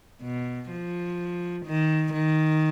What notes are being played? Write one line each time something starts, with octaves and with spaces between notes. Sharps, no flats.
B2
F3
D#3
D#3